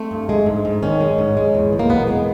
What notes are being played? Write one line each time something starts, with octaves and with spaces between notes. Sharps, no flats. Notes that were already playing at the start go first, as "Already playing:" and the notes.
Already playing: A3 C4
G2
G#3
G#2
G#2
D#3 C#4
G#3
G#2
G#3
E2
E2
A#3
B2 B3
G#3 B3